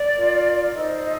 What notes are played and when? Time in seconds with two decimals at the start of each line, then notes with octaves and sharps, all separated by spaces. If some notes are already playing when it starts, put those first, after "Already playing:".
Already playing: D5
0.13 F4 A#4
0.72 D#4 A4 C5 D#5
1.02 D#5